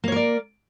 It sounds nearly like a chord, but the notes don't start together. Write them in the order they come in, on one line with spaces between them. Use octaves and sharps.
A#3 C#5 A#4 D5